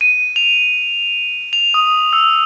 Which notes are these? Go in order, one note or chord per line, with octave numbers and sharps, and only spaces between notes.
D#7
F7
F7
D#6
E6